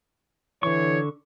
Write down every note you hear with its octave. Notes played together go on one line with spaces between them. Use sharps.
D3 E3 C#5 C#6